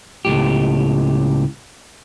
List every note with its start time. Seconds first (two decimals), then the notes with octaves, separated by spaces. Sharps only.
0.25 C#2 A2 G4